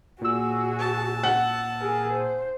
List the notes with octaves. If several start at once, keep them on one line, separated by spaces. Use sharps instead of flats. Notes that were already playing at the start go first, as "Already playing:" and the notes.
A#2 F#4 G#4 E6
A5
F#5
G#4 A#4
C5